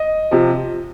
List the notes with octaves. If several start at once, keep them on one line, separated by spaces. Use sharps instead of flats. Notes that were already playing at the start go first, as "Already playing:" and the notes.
Already playing: D#5
C3 F3